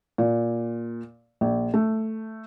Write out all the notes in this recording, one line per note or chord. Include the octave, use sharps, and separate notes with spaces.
A#2
A#1
A3